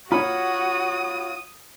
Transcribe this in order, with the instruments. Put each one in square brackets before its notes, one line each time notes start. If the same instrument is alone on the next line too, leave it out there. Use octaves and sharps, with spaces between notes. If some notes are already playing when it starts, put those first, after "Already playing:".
[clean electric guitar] F4 C#5 [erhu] F#4 [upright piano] B5 [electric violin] D#6